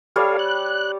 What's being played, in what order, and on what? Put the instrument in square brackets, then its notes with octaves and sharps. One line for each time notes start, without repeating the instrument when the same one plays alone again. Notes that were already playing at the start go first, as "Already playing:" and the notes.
[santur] G3 C#5 D5 [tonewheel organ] A4 F5
[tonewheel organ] F#6